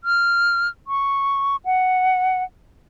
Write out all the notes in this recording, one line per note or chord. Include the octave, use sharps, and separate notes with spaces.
F6
C#6
F#5